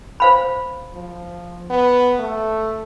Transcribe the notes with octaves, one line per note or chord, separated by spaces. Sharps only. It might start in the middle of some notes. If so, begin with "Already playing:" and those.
C5 F5 B5
F3
B3
A3